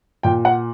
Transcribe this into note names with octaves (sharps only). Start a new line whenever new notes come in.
A#2 G5
F#5